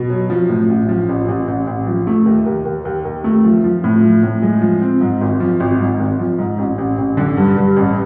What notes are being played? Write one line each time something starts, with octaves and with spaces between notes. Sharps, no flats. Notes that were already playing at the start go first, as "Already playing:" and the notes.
Already playing: B2
F#3
F3
A2
A1
F3
A1
A1
A1
A1
F3
A3
D#2
D#2
D#2
D#2
D#2
A3
F3
F3
A2
F3
A2
G#3
F3
C4
G#2
G#1
F3
G#1
G#2
G#1
F3
G#2
A1
A1
A1
D3
G2
G2
A1